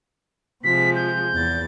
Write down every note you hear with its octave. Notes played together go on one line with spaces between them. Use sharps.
C3 F3 G#3 B6
G6
E2 A6